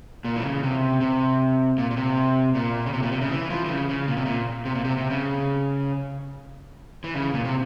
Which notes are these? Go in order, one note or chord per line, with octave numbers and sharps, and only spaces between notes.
A#2
E3
C#3
C3
C3
A#2
A#2
C3
A#2
C#3
C3
A#2
C3
C#3
E3
F3
E3
C#3
C#3
A#2
C3
A#2
C3
A#2
C3
C3
C#3
E3
C#3
A#2
C3